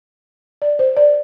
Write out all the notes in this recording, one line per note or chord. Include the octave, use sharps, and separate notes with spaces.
D5
C5
D5